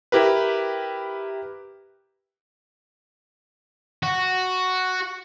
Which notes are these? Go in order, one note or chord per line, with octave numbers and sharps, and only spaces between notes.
E4 G4 A#4 B4
F#4